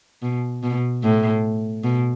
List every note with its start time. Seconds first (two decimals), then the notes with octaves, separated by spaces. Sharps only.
0.22 B2
0.63 B2
1.03 A2
1.84 B2